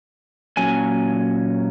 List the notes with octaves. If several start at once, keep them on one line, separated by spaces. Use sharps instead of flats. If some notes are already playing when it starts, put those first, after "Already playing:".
A#2 F#3 C#4 G#5